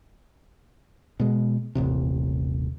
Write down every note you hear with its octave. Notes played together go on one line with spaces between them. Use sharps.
B2 G#3
D#1 A1 C3